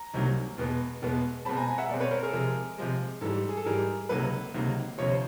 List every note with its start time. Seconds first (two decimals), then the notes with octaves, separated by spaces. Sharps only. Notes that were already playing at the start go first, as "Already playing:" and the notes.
Already playing: A#5
0.14 C2 C3 D#3 F#3 A#3
0.58 E2 B2 G#3 B3
1.02 E2 B2 G#3 B3
1.45 B2 G#3 C4 A5 B5
1.56 G#5 A#5
1.67 G#5 A#5
1.78 E5 F#5
1.89 B2 G#3 C4 D5
2.00 B4 C#5
2.11 A#4 C5
2.22 G#4 A#4
2.29 A4
2.33 C3 F3 G#3 G#4 A#4
2.78 C3 F3 G#3
3.21 G#2 E3 G3 A4
3.49 G#4
3.57 A4
3.65 G#2 E3 G3 G#4 A#4
4.09 C#2 C3 D#3 F#3 A#3 A4 B4
4.54 C#2 C3 D#3 F#3 A#3
4.98 D2 C3 F3 C#5
5.10 C5